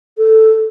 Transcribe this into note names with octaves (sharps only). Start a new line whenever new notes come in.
A4